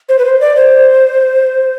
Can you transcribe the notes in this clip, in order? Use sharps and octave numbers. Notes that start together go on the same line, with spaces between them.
C5
B4
C5
D5
C5